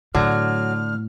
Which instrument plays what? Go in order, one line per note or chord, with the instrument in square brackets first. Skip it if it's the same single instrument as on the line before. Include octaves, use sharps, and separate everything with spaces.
[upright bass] A2 [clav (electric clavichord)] D3 [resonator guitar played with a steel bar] F#3 [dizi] F6